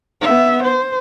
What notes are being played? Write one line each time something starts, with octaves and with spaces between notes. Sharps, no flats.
B3 E5
C5